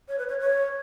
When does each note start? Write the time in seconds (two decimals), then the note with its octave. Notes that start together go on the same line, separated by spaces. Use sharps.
0.08 C#5
0.18 B4
0.29 C#5
0.41 C#5